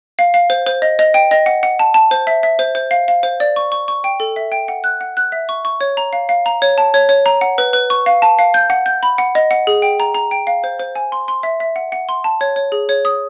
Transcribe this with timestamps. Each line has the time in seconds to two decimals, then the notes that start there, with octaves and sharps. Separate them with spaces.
0.19 F5
0.34 F5
0.50 C5
0.66 C5
0.82 D#5
0.99 D#5
1.14 G5
1.31 D#5
1.46 F#5
1.63 F#5
1.79 A5
1.94 A5
2.11 C5
2.27 E5
2.43 E5
2.59 C5
2.75 C5
2.91 F5
3.08 F5
3.23 C5
3.40 D5
3.56 C#6
3.72 C#6
3.88 C#6
4.04 G5
4.20 A4
4.36 E5
4.52 G5
4.68 F#5
4.84 F#6
5.01 F#5
5.17 F#6
5.32 E5
5.49 C#6
5.65 C#6
5.81 C#5
5.97 A#5
6.13 F5
6.29 F5
6.46 A#5
6.62 C#5
6.78 A5
6.94 C#5
7.09 C#5
7.26 A#5
7.41 F#5
7.58 B4
7.73 B4
7.90 C#6
8.06 F5
8.22 A5
8.39 F5
8.54 G6
8.70 F#5
8.86 G6
9.03 B5
9.18 F#5
9.35 D#5
9.51 F#5
9.67 G#4
9.82 G5
10.00 A#5
10.14 A#5
10.31 G5
10.47 F5
10.64 C5
10.80 C5
10.95 G#5
11.12 C6
11.28 C6
11.43 E5
11.60 E5
11.76 F#5
11.92 F#5
12.09 C6
12.24 A5
12.41 C#5
12.56 C#5
12.72 G#4
12.89 C#5
13.05 D#6